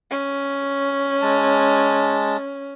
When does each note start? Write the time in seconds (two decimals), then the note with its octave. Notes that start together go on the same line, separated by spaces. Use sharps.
0.11 C#4
1.22 G#3 A5